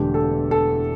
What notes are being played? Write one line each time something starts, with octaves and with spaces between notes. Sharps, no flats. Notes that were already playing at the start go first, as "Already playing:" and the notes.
Already playing: E1 E2 D3 A3 G4
A4
A4